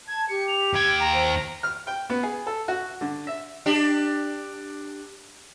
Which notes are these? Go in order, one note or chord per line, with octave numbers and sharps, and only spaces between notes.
A5 G#6
G4 C#7
F7
D#2 G5 G#6
A#5
C5
F6
G5
B3
G#4
A4
F#4
D3
E5
D4 G4